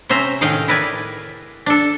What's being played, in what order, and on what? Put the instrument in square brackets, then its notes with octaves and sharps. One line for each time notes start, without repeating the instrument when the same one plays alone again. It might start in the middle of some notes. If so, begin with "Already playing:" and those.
[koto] C3 C#4 C5 E5 A#5
A2 D#3 G#4 F5 G5
E4 A#4 B4 D5 G#5
D4 A4